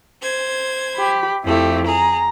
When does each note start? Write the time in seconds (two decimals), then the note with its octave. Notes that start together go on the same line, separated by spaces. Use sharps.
0.22 C5 G#6
0.96 G4 B5
1.44 F2 A3 E4 G4
1.87 G#4 A#5